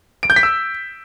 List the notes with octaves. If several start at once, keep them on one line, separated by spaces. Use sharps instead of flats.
D7
G6
B6
E6